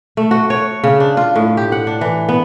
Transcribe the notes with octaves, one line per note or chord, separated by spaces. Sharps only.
A3
F#4
C#5
C#3
D4
F4
A2
G4
F#5
D4
E3
B3